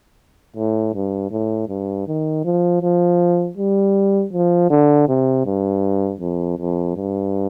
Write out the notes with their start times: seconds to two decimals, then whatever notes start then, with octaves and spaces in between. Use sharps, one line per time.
0.57 A2
0.95 G2
1.31 A2
1.69 G2
2.07 D#3
2.45 F3
2.82 F3
3.57 G3
4.33 F3
4.70 D3
5.08 C3
5.46 G2
6.20 F2
6.59 F2
6.96 G2